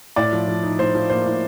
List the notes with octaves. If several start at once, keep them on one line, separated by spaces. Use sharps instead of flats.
A2 D5
F3
F3
D#4
A2 C5
F3
A#3 C5
A2